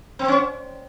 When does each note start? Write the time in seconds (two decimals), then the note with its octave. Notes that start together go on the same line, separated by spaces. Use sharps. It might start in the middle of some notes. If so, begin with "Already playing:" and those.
0.19 C4
0.28 C#4